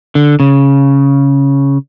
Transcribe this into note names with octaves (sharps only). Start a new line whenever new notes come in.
D3
C#3